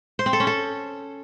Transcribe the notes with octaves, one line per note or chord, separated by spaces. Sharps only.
C5
C4
A4
C#4
A4